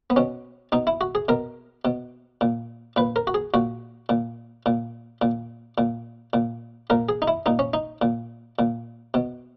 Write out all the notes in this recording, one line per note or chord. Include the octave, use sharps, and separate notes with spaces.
B3
B2 C#4
B2 D#4
E4
F#4
G#4
B2 A#4
B2
A#2
A#2 B4
A#4
F#4
G#4
A#2 F#4
A#2
A#2
A#2
A#2
A#2
A#2 A#4
G#4
D#4
E4
A#2 D#4
C#4
D#4
A#2
A#2
B2